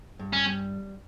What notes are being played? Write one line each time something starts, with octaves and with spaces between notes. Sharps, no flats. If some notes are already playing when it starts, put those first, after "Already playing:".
G2
C#4
G3